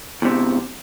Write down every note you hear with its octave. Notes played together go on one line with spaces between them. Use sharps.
E2 C3